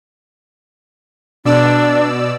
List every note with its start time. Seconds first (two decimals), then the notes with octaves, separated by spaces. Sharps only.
1.45 B2 D4 D5 E6